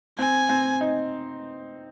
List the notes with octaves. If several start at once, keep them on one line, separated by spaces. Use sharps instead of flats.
C4 G#5
C4
D#4